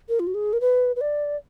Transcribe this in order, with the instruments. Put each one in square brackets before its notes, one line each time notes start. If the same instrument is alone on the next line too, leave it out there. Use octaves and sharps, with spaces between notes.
[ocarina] A#4
F4
F#4
G#4
A#4
B4
B4
D5